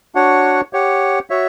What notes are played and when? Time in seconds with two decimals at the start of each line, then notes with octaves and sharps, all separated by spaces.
0.15 D4 F#4 C#5 F#5
0.73 G4 C#5 F#5
1.30 F#4 C#5 E5